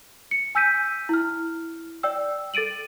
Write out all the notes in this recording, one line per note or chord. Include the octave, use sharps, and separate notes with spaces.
C#7
G#5 E6 G6 B6 D#7
E4 F6
D5 G5 E6
A4 A6 D7 D#7 F#7